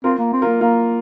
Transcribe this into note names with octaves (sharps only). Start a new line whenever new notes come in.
C4 F4 A#4
A#3
C4
F4 A#4
A#3
A#3 F4 A#4